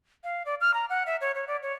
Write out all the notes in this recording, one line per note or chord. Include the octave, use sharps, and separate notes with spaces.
F5
D5
F6
A#5
F#5
E5
C#5
C#5
D5
C#5